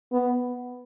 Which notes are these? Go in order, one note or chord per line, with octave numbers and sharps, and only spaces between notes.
B3